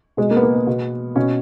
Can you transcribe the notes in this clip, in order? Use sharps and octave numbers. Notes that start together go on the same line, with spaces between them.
B2 G#3
A#3
B3
A#3
B3
B2
B2 C#4